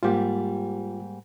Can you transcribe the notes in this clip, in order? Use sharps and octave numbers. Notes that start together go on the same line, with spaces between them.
G#2 G3 A#3 F4 G4